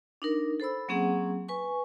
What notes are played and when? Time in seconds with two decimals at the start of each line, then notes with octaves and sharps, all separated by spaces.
0.22 D4 D#4 A#4
0.60 A4 C5 B5 E6
0.88 F#3 A#3 C4 C#4 G#4 F#5
1.48 B4 G#5 C#6